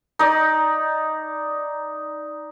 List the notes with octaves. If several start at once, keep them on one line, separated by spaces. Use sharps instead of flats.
D#4 D5